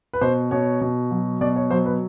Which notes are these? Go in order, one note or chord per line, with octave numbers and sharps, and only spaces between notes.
B4
B2 C5
B2 C#5
B2
F#3
B2 D5
C#5
F#3 C5
B4